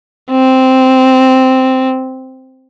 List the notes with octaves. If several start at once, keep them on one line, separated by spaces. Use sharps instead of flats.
C4